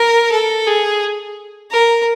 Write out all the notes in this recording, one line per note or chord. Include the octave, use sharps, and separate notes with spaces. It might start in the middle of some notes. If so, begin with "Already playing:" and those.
Already playing: A#4
A4
G#4
A#4